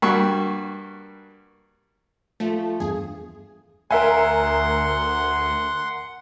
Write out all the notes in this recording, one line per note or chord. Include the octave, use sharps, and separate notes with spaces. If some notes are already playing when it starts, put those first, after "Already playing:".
G2 G3 A#3 F#4 C#6
F3 A3 F4
E2 G2 G#4
D2 A#4 E5 F#5 G#5 C6